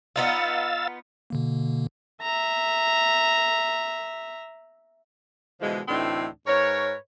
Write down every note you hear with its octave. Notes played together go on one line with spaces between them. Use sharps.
B3 D#4 F4 F5 E6 A6
B2 D3 A#3
E5 A#5
B2 D3 E3 F3 G#3
D2 A2 E3 C4 D4 D#4
G#2 A#4 B4 C#5